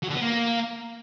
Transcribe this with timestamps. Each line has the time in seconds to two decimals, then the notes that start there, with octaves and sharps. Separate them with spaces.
0.03 F#3
0.09 D3
0.15 B3
0.21 A#3